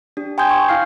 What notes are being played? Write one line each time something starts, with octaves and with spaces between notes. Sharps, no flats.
D4 G4
G5 G#5 C6 D#6 G6 G#6
C#6
E4 F5 F6 C7